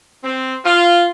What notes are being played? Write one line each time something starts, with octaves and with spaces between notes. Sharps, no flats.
C4
F4